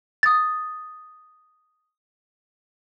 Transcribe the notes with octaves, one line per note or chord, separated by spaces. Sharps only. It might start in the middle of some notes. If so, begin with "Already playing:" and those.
D#6 A6